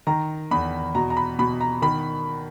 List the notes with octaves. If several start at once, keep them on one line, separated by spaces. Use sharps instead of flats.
D#3 A#5
E2 B5
B2 A#5
A#5
B5
B2 B5
A#5
D#3 B5